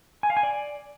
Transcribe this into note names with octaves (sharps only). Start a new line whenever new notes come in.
G#5
F5
G#5
D5